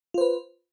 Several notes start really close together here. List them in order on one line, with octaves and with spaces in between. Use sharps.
F4 C5 B4